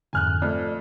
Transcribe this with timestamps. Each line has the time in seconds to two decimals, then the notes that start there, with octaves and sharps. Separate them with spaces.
0.13 F2 G#2 D3 G#5 F6 F#6
0.42 F2 A3 D5